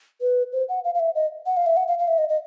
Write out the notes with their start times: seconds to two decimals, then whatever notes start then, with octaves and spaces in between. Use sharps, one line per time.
0.21 B4
0.53 C5
0.69 F#5
0.84 F5
0.95 F5
1.00 E5
1.15 D#5
1.46 F#5
1.57 F5
1.66 E5
1.77 F#5
1.88 F5
1.99 F5
2.08 E5
2.18 D#5
2.29 D#5